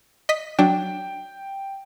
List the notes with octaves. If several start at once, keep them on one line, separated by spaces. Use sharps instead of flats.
D#5 B6
F#3 D4 G5